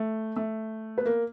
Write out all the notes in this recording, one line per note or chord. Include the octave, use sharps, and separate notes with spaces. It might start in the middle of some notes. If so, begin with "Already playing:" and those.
Already playing: A3
A3
B3
A#3